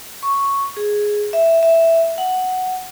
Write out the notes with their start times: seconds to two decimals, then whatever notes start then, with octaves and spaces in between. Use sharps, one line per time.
0.23 C#6
0.77 G#4
1.33 E5
1.63 E5
2.18 F#5